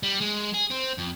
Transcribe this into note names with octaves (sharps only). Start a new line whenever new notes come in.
G3
G#3
G#4
C4
F2